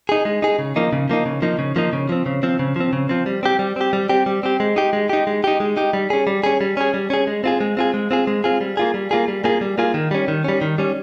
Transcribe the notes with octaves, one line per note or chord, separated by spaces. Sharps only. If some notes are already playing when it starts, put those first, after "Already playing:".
D#4 G#4
G#3
D#4 G#4
C#3
F3 A#3 D#4
C#3
F3 A#3 D#4
C#3
F3 A#3 D#4
C#3
F3 A#3 D#4
C#3
F3 C4
C#3
F3 C4
C#3
F3 C4
C#3
F3 C4
G3
C4 G4
G3
C4 G4
G3
C4 G4
G3
C4 G4
G#3
D#4 G4
G#3
D#4 G4
G#3
D#4 G4
G#3
D#4 G4
G3
C#4 G#4
G3
C#4 G#4
G3
C#4 G#4
G3
C#4 G#4
G#3
C4 F4 G#4
G#3
C4 F4 G#4
G#3
C4 F4 G#4
G#3
C4 F4 G#4
G3
A#3 F4 G#4
G3
A#3 F4 G#4
G3
A#3 F4 G#4
G3
A#3 F4 G#4
D#3
G3 C#4
D#3
G3 C#4
D#3
G3 C#4